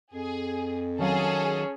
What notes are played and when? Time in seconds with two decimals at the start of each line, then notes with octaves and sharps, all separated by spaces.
0.14 F2 G#4
0.98 D#3 F#3 C#4 G#4 A4 F5